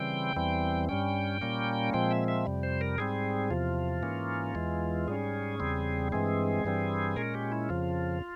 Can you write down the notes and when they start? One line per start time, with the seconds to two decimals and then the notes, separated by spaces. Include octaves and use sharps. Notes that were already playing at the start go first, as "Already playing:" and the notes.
Already playing: C#3 E3 G3 C4 G5
0.36 E2 E3 G3 C4
0.89 G2 G3 C#4 G5
1.41 A#2 G3 A#3 C#4
1.93 A#2 F3 G#3 C4 G5
2.11 E5
2.28 E5
2.46 F2 C3 G3
2.63 C5
2.81 A#4
2.98 G#2 G3 C4 G#4
3.50 E2 C3 F3 F4
4.03 G#2 E3 A#3 C#4
4.55 E2 E3 G#3
5.07 G#2 G3 C#4 G#4
5.60 E2 C#3 G3 C4
6.12 G2 E3 G#3 C4 G#4
6.64 G2 E3 G3 C4
7.16 A#2 G#3 C#4 A#4
7.34 G4
7.52 E4
7.69 F2 C#3 F3 F4